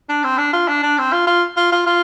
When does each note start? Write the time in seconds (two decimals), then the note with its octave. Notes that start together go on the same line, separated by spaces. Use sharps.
0.09 D4
0.24 C4
0.38 D4
0.53 F4
0.68 D4
0.83 D4
0.98 C4
1.12 F4
1.27 F4
1.56 F4
1.72 F4
1.86 F4